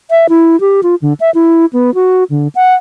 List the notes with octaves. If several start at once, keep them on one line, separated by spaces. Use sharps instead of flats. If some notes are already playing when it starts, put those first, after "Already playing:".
E5
E4
G4
F4
D3
E5
E4
B3
F#4
D3
F#5